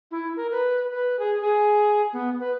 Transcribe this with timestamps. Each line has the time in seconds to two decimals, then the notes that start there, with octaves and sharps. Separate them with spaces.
0.11 E4
0.36 A#4
0.51 B4
0.91 B4
1.19 G#4
1.41 G#4
2.13 B3
2.40 B4